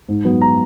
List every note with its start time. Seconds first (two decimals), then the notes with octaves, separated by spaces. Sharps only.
0.08 G#2
0.25 F#3 B3
0.42 A#5